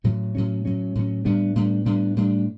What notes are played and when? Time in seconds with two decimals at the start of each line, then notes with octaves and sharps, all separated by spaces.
0.04 A2 F#3 C#4
0.35 A2 F#3 C#4
0.65 A2 F#3 C#4
0.95 A2 F#3 C#4
1.25 A2 G3 B3 D4
1.55 A2 G3 B3 D4
1.85 A2 G3 B3 D4
2.16 A2 G3 B3 D4